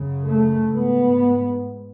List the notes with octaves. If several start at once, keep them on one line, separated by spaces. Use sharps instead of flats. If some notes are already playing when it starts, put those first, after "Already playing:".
Already playing: F#2 C#3
A3
G#2 B3